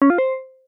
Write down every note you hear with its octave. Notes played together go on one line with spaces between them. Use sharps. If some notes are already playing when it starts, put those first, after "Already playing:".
C#4
F4
C5